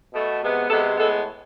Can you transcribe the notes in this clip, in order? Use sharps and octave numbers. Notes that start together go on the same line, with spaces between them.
B2 A3
C3 G#3 B3
C3 G#3 B3 A4
A2 G#3 B3 A4